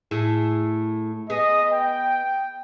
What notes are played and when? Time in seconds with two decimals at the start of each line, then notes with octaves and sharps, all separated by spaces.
0.11 A2 E4 G#4
1.30 B3 G#4 D#5
1.71 G5